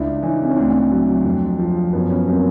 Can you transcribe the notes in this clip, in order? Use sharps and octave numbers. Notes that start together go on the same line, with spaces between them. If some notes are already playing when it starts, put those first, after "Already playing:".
Already playing: C#2 D4 E4
E3 C#4 D#4
C4
C#4
D2 C4 D4
F#3
F2
F3
F#2 B3 C#4
B3 C#4
F#3 A#3 C4